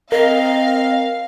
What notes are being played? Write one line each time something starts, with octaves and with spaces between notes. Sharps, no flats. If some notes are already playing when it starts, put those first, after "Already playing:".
C4 A#4 D#5 F5